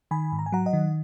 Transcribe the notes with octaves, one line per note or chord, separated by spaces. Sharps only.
D#3 G#5 B5
G#2
A#5
G#5
F#3 F#5 A#5
D#5 F#5
D#3